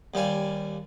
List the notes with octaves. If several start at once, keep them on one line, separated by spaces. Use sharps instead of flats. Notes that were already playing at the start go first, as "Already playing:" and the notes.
D#2 G3 F5 G#5